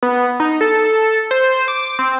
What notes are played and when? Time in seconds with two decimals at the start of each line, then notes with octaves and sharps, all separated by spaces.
0.03 B3
0.40 D#4
0.61 A4
1.31 C5
1.68 D6
1.99 C4